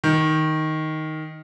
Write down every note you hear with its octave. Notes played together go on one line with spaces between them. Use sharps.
D#3